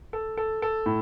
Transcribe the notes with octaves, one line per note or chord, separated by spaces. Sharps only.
A4
A4
A4
A2